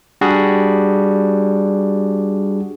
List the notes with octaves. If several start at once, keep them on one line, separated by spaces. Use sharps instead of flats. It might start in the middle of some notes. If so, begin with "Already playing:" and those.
G3 D4 F#4 G#4